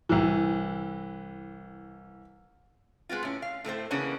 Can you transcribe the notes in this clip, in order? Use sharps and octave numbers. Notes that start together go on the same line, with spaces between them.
C2 E3
G#3 B3 C4 F4
A2 C#4
F5
A2 A3 C4 C5
C#3 E3 A#3 B3 C#4 D4